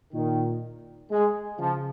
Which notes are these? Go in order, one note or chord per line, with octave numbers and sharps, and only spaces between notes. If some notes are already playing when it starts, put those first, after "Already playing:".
A#2 D#3
G#3
C#3 F3